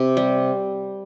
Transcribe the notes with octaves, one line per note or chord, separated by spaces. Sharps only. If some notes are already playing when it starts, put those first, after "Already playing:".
Already playing: C3
G3